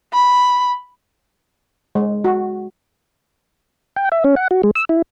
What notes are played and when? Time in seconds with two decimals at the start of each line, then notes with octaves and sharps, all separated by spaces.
0.13 B5
1.95 G#3
2.24 F#4
3.96 G5
4.12 E5
4.24 C#4
4.36 F#5
4.51 F#4
4.63 G#3
4.75 E6
4.89 E4